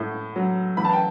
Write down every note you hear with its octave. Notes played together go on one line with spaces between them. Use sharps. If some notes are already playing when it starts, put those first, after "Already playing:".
Already playing: A2
F#3
E3 B5
A5
G5